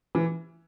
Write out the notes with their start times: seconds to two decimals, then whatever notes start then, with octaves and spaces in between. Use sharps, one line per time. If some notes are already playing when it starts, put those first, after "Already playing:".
0.15 E3